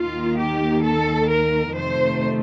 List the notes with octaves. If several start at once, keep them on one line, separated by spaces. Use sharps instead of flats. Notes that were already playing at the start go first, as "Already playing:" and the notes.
Already playing: D#2 D#3 A#3 F4
G4
A4
A#4
F2 C3 D#3 A3 C5